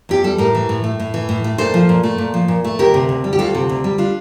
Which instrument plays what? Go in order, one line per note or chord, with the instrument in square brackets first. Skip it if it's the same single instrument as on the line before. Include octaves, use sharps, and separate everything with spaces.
[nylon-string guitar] E2 G4
G3 A4
A2 G4 A#4
E3
A2
A3
A2
E3
A2
A3
A#2 A4 C5
F3
A#2
A3
A#2
F3
A#2
A3
D2 G4 A#4
C3
D2
G3
G4
D2 F4 A4
C3
D2
G3
D4 F4